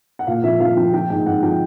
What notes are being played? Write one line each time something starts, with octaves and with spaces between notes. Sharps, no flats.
F#5
A#2 F5
F3 E5
F3 F5
F3 G5
F3 G5
G#2 G5
G#2 F#5
F3 G5